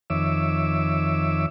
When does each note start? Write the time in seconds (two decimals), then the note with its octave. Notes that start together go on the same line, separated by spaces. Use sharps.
0.10 F2 D#3 C#5 E5 D6 E6